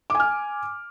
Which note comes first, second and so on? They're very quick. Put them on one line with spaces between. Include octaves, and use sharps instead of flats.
D6 G#5 F6